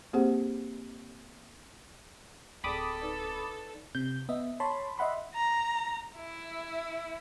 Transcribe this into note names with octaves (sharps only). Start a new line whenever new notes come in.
A#3 C4 G4 G#4 C5 F#5
D1 G#4 A4 D5 G5 B5 D6 D#6
D#4 B4 D5
C3 G6
B3 D#5 E5
C#5 A5 B5 C6
D#5 E5 F#5 B5 C6
A#5
E4